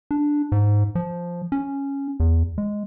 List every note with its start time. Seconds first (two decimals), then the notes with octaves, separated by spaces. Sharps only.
0.11 D4
0.52 G#2
0.95 F3
1.52 C#4
2.20 E2
2.58 G#3